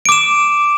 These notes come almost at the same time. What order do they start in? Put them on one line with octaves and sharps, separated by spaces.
D7 D6 E7